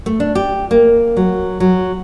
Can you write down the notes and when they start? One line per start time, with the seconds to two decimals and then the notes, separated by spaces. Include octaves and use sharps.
0.06 A3
0.20 D4
0.35 G4
0.71 A#3
1.17 F#3
1.60 F#3